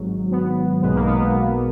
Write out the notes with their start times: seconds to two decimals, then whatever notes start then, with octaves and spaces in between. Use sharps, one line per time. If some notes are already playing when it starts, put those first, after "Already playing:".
Already playing: G#1 G#2 F#3
0.31 B3
0.82 B1 B2 G#3 B3
0.94 A#3
1.07 B3